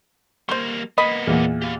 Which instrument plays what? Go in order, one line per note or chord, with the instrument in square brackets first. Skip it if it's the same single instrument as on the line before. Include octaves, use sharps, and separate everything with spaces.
[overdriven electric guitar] G3 A#3 [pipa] C5 C#6
[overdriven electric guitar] A#3 B3 [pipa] D#5 B5
[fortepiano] E2 A#2
[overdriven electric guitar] G4 F5